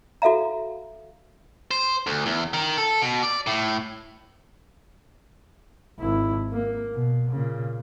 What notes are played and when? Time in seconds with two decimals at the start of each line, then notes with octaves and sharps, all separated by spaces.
0.22 F#4 A4 E5 F5 A#5
1.71 C5
2.07 D2
2.26 E2
2.53 D#3
2.78 A4
3.02 B2
3.23 D5
3.47 A2
5.99 G#1 E4
6.52 A#3
6.94 B2
7.32 A#2 C#3